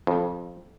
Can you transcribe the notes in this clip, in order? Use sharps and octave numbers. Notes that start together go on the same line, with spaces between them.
F2